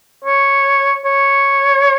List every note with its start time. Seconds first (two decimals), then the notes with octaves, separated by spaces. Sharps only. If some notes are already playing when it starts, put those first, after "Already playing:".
0.24 C#5
1.05 C#5